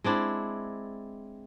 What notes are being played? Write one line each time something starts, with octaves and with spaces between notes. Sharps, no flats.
G#3 C4 D4 E4